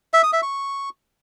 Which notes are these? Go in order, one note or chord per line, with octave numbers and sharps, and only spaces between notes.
E5
D#6
E5
C#6